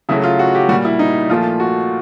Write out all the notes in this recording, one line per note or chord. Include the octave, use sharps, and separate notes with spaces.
C#3 F#3 A3 E4
F4
F#4
G4
A#2 G3 F#4
E4
D#4
A#2 F3 A3 F4
F#4